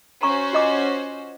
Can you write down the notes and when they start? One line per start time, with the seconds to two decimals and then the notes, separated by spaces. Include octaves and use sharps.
0.23 C#4 F#4 C5 A#5 C#6
0.53 F4 D#5 D6